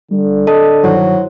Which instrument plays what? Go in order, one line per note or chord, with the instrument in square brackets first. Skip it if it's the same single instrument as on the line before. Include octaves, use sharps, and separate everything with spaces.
[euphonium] D3 [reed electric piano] G3
[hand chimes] A4 A5 D#6 [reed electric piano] D#5
[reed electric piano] G2 D#3 [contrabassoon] F#3 [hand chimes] E4 F#4 C5